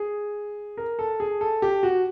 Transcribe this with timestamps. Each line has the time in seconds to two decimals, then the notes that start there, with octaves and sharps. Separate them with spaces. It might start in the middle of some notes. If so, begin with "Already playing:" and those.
Already playing: G#4
0.77 A#4
0.99 A4
1.20 G#4
1.41 A4
1.62 G4
1.83 F#4